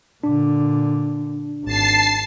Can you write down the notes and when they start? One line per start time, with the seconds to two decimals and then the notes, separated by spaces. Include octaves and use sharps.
0.24 A#2 D3 D4
1.65 G#1 A5 C7